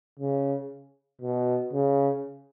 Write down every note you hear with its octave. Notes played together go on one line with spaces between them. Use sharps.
C#3
B2
C#3